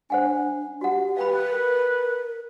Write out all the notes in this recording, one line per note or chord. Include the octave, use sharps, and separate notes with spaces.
D4 C5 F#5 G#5
F#4 G4 F#5
B4 F5 G5 B5
A#4